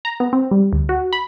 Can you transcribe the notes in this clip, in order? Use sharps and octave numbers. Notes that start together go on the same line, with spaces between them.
A#5
B3
C4
G3
D2
F#4
B5